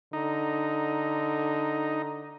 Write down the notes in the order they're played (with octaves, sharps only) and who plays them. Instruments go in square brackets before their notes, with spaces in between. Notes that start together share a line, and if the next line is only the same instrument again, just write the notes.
[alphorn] D3 [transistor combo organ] D#4